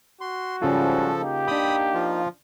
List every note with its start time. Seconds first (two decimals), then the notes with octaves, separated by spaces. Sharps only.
0.21 F#4 C6
0.62 G#2 C#3 F3 G3 C#4 F4 A4
1.19 A#3 D#4 G4
1.48 D4 G5 B5 D#6
1.94 F3 F4